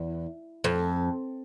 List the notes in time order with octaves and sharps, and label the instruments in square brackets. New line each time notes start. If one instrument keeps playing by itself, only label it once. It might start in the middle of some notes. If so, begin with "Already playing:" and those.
Already playing: [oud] E2
F2